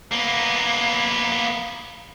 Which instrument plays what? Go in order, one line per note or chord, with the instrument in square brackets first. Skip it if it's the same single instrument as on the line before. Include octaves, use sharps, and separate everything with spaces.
[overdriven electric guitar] A#3 B3